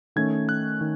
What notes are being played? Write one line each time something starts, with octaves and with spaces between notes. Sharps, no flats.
D#3 A3 C#4 G#6
F#6
D#3